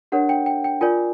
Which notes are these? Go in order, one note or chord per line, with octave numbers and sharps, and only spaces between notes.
D4 G4 A#4 C#5 F#5
G5
G5
G5
F4 A#4 D5 G#5